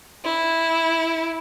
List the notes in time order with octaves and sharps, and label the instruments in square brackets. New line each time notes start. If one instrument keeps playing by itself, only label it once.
[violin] E4